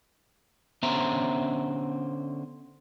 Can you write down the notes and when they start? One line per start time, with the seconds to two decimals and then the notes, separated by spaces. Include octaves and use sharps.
0.83 D3 B3 C#4 C5 E5 A#5